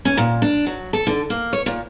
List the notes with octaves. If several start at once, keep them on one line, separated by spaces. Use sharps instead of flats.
C#4
A#2
D4
F#3
A4
D3
A#3
C#5
A#2